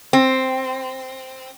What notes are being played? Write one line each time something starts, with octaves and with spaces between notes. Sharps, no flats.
C4